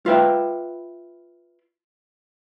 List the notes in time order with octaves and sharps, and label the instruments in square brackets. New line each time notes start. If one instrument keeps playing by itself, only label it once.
[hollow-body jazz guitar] F4 B4 E5 G5